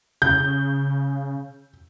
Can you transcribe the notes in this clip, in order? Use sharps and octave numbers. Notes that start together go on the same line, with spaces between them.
C#3 G6